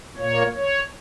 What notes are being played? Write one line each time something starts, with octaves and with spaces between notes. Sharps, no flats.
A#2 A#3 C#5
C#5